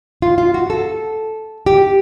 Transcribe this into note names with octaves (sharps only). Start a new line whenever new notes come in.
F4
F4
F#4
A4
G4